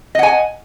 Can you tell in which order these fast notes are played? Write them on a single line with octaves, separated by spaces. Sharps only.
D#5 F#5 G#5